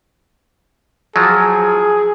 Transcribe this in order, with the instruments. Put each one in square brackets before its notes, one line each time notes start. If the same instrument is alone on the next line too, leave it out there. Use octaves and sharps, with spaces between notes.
[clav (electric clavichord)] F3 F#3 [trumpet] G#4